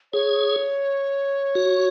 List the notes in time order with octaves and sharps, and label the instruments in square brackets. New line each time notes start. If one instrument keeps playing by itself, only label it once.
[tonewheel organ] G#4 [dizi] C#5
[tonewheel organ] F#4